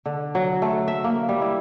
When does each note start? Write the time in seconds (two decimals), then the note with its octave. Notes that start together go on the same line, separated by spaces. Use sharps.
0.06 D3
0.35 F#3
0.62 A3
0.88 E5
1.04 A#3
1.29 G3
1.41 E4